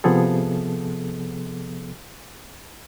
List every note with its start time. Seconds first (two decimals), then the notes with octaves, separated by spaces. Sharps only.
0.04 C3 F3 B3 G#4 A4